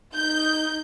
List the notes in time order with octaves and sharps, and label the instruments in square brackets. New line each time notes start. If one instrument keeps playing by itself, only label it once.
[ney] D#4 [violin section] G6